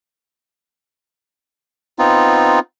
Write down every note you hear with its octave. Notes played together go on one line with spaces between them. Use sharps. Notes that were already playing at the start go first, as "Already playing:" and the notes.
B3 C4 D#4 F4